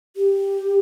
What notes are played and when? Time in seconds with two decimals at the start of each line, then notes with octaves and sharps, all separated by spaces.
0.16 G4